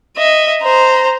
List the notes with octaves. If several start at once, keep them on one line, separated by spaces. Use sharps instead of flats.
D#5 E5
C5 A#5